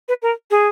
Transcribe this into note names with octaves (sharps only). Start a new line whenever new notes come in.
B4
A#4
G#4